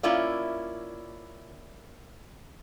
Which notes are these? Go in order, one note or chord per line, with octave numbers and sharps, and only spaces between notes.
A#3 C#4 E4 F4 D5